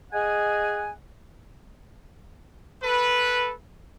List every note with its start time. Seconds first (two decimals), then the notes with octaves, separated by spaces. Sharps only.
0.13 G#4 D#5 F#5 G#5
2.83 A4 B4